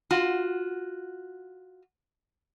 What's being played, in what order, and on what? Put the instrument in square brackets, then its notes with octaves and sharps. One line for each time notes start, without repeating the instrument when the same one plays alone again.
[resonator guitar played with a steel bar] F4 F#4